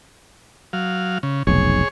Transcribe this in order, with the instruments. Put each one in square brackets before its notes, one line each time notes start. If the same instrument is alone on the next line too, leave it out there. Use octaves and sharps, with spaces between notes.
[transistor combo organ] F#3 F5
C#3
[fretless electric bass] F1 B1 [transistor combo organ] G#4 C#5